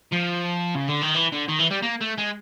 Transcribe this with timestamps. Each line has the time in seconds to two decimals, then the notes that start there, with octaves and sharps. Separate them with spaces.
0.12 F3
0.75 C#3
0.88 D3
1.01 D#3
1.14 E3
1.32 D3
1.49 D#3
1.59 E3
1.71 G3
1.82 A#3
2.01 A3
2.18 G#3